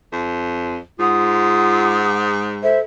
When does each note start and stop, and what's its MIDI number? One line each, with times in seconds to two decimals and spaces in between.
0.12 0.78 41
0.99 2.79 44
0.99 2.11 65
0.99 2.22 78
0.99 2.43 87
2.62 2.80 69
2.62 2.80 72
2.62 2.76 76